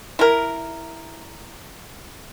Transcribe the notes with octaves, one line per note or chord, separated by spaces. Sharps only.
E4 A#4